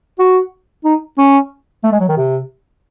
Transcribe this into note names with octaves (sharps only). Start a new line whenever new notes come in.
F#4
D#4
C#4
A3
G#3
F#3
D#3
C3